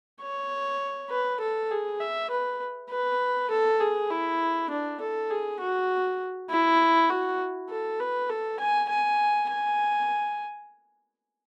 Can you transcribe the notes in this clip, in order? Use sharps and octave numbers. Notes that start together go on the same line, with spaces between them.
C#5
B4
A4
G#4
E5
B4
B4
A4
G#4
E4
D4
A4
G#4
F#4
E4
F#4
A4
B4
A4
G#5
G#5
G#5